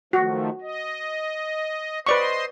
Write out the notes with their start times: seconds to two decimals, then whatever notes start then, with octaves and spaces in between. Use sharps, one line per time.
0.13 D#3 F3 A3 F#4
0.61 D#5
2.06 B4 C5 D5 D#5 C6 C#6